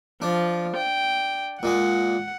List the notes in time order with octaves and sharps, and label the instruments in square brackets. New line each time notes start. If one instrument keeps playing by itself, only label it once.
[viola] F3 [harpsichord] D4
[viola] G5
[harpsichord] A#2 G#3 [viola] F#5